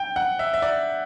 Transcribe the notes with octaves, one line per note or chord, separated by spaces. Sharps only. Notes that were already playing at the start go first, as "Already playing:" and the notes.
Already playing: G5
F#5
E5
E5
D5